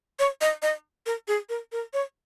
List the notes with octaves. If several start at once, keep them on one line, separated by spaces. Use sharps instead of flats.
C#5
D#5
D#5
A#4
G#4
A#4
A#4
C#5